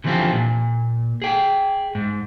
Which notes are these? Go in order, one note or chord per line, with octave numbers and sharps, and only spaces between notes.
D3 E3 F3 C4 F4 G4
A#2
G#4 G5
G#2